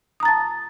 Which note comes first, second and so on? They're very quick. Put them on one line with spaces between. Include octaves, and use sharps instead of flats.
D#6 A#5 A6 A5